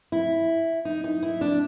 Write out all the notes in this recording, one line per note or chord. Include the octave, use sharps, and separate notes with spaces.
E4
D#4
D#4
E4
D4